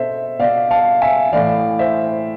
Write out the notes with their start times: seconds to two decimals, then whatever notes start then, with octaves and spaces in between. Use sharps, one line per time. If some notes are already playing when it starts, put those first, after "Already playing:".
Already playing: B2 A4 C5 E5
0.39 B2 D5 F5
0.71 F5 A5
1.02 E5 G#5
1.32 A2 E3 D5 F5
1.79 C5 E5